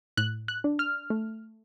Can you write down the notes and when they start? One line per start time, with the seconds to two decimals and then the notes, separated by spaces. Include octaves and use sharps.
0.17 A2 F#6
0.48 F#6
0.64 D4
0.79 F6
1.10 A3